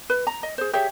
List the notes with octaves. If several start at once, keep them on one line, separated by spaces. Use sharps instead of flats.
B4
A#5
D#5
G#4 C5
G4 G#4 C#5 E5